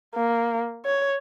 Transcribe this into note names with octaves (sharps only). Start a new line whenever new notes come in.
A#3
C#5